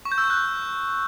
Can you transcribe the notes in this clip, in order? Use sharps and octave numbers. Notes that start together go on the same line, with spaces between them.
C#6
G6
E6
G6
F#6